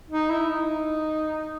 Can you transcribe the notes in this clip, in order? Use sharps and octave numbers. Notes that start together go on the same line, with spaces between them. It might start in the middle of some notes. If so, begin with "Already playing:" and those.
D#4
E4
D#4